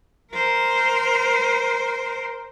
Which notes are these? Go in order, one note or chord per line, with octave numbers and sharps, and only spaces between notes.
A#4 C5